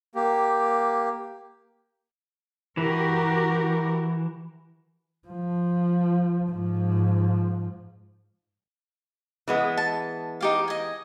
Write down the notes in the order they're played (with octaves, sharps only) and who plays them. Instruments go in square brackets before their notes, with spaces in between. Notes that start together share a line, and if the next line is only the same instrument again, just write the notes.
[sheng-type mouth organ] A#3 G4
[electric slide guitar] E3 [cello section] F#4 G4 A#4
[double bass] F3
G#2 F3
[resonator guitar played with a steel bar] E3 G#3 B3
[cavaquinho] A5
D#4 G4 F5
D#5 G#5